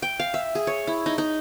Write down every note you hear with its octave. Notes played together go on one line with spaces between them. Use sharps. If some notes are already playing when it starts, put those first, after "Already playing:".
G5
F5
E5
G#4
C#5
E4
D#4
D#4